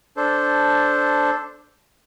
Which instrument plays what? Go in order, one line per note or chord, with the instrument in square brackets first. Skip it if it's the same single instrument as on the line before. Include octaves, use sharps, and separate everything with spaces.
[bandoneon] D4 A4 C5